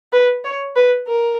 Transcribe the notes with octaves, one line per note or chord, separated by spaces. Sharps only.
B4
C#5
B4
A#4